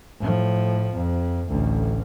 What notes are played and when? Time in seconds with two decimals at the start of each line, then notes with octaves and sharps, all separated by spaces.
0.20 A2 F3
0.94 F2
1.49 A1 D2